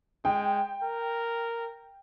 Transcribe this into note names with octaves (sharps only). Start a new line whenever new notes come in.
G#3 G5
A#4